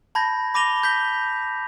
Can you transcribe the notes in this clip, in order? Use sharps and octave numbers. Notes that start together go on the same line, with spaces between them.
A5 B5 G6 G#6 A#6
B5 D6 A#6 D#7 F7 G7
G6 A#6 B6 G7